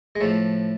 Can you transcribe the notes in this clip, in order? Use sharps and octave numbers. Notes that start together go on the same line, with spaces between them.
G#3
A2 F3 A3